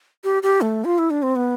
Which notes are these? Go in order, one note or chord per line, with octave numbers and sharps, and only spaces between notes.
G4
G4
A3
F4
E4
D4
C4
B3